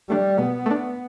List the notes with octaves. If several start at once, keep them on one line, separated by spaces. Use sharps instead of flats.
G3 A3 D4
B2 B3
A3 D4